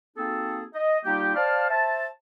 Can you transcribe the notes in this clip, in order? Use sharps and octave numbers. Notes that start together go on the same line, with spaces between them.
A#3 C4 D#4 F#4 G#4 A4
D#5
G3 A#3 D#4 F4 G4
C5 D5 F5 A5
C5 E5 A5